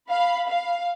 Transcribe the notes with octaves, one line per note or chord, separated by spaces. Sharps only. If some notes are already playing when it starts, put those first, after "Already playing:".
F5 B5
F5